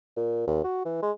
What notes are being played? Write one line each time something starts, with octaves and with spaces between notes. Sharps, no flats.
A#2
D#2
F#4
E3
G#3